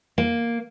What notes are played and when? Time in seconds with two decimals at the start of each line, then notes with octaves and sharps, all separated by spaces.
0.18 A#3